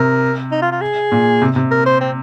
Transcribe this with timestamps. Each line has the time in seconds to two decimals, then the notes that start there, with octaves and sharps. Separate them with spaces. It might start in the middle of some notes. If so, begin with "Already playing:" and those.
Already playing: C3 A#4
0.51 D#4
0.62 F4
0.72 F4
0.81 G#4
1.12 A#2
1.42 C3
1.56 C3
1.71 A#4
1.86 C5
2.01 C4